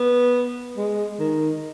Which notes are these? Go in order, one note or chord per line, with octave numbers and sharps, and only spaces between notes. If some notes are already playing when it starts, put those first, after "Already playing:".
Already playing: B3
G#3
D#3